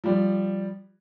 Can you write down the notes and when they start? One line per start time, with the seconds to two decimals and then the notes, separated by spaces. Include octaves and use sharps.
0.04 F3 G3